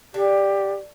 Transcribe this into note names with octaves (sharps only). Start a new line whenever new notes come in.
D3 G4